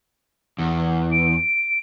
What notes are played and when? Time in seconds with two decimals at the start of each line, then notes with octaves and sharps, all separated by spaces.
0.58 E2
1.12 D7